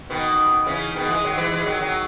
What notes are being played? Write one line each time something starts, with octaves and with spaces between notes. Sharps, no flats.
B2 D#3
C#3 E3
B2 D#3
E3 G#3
D#3 F#3
E3 G#3
E3 G#3
D#3 F#3
D#3 F#3